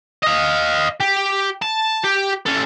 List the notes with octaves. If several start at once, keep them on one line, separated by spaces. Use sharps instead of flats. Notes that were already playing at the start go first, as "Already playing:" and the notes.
D#5 F5
G4
A5
G4
C#4 A4